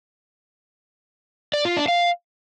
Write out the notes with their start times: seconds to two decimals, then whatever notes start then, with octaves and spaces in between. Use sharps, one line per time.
1.54 D5
1.65 F4
1.77 D4
1.88 F5